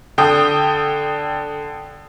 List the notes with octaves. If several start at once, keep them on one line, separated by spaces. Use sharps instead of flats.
D3 G5 D#6